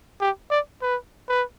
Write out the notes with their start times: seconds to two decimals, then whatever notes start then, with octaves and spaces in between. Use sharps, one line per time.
0.21 G4
0.50 D5
0.82 B4
1.28 B4